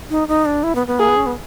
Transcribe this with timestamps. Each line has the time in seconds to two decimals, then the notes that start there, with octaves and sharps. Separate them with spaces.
0.10 D#4
0.28 D#4
0.46 D4
0.63 E4
0.75 B3
0.87 B3
0.99 A#3 G#4
1.08 B3
1.17 C#4
1.26 B3